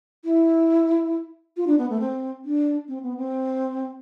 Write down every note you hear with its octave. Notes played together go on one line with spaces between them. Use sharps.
E4
F4
D4
B3
A3
C4
D4
C4
B3
C4